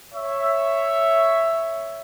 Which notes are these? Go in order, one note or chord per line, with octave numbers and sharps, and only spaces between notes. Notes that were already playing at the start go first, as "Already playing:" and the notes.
C#5 E5